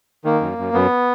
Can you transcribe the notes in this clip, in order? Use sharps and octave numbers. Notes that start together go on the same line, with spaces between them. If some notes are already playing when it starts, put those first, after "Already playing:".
D#3 A#3
F#2
F#2
F#2 B3